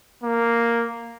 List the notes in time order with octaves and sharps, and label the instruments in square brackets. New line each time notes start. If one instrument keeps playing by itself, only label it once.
[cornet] A#3